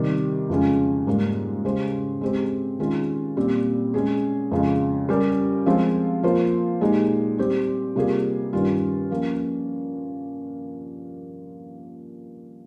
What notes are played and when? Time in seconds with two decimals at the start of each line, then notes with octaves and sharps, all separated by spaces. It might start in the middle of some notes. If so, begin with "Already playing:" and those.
Already playing: C3 D#3 G3
0.50 F2 C#3 G#3 C#4
1.07 G#2 G3 A#3
1.65 C#3 G#3 C#4 G4 C5
2.21 G#3 C4 G4 C5
2.79 D#3 G#3 C#4 F4
3.37 A#2 G3 C4
3.94 G#3 C#4 G#4
4.51 F2 C#3 G#3
5.09 G3 C#4 G4 A#4
5.66 F3 G#3 C4 F4 C5
6.23 F3 A#3 F4 C5
6.81 A#2 G#3 D#4 G4
7.38 G3 C4 G4 C5
7.96 C3 G3 A#3 F4 G#4
8.53 G2 D#3 G3 C#4 F4
9.11 F3 A#3 C#4